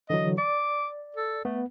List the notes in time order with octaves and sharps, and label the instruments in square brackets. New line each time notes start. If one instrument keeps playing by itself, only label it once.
[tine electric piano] D3 E3 F#3 [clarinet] D#5
[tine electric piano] D5 [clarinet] D6
[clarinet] A4
[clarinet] A3 [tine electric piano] B3